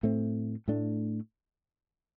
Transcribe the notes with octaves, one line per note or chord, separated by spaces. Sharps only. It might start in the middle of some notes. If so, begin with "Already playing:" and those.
A2 A3 C4
A2 A3 D4